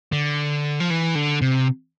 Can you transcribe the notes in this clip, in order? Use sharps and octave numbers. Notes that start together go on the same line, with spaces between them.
D3
F3
E3
D3
C3